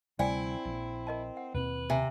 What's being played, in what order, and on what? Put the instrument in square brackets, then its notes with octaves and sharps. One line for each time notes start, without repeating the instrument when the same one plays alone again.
[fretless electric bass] D2 C3 G3 [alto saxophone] C4 [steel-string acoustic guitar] E4 [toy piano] D5 G5 G#5
[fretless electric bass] A#1
[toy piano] A#4 D#5 A5
F#5
[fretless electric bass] D#2 B2 C4 [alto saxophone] B4
[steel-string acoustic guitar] C3 [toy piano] E5 G#5